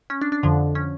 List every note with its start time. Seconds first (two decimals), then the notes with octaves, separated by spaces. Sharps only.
0.10 C#4
0.21 D4
0.32 D4
0.43 F2 D3 F3
0.75 C#4